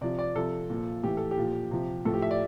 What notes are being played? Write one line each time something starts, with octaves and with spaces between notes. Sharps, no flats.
C3 F3 D5
D5
C3 F3 A4
A#2 F3
A2 E3 G4
A4
G4
A#2 F3
C3 F3
A2 F3 A4
G4
E5
D5